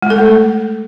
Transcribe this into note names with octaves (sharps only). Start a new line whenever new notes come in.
G#3
A4
A3